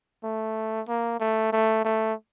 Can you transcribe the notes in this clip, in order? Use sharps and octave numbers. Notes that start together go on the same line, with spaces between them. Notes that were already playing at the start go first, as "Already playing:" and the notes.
A3
A#3
A3
A3
A3